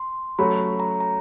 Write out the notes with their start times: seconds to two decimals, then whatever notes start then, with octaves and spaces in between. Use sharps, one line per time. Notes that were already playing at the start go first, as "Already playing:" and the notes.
Already playing: C6
0.39 F#3 A3 C#4 F#4 B5
0.80 A#5
1.00 A#5